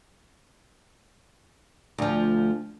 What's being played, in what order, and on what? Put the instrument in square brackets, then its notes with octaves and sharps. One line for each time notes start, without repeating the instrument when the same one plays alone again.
[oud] D2 F3